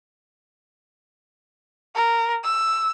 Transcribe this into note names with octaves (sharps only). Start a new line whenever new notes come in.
A#4
E6